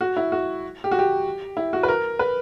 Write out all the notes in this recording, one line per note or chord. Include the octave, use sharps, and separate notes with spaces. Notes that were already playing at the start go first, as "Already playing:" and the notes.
F#4
E4
F#4
G4
F#4
G4
E4
F#4
B4
A#4
B4